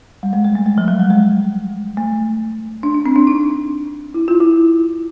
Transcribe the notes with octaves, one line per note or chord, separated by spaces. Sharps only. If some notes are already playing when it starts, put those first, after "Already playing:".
G3
G#3
G#3
A3
G#3
F3
F#3
G3
G#3
A3
D4
D4
C4
D4
D#4
E4
F4
E4